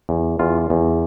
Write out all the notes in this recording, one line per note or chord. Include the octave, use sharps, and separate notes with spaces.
E2
E2 F4
E2